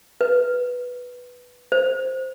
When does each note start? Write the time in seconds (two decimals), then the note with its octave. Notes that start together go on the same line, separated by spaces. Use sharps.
0.21 B4
1.72 C5